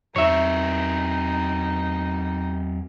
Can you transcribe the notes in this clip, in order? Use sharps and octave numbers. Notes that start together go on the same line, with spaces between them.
E2 F#3 C4 D#4 C#5 E5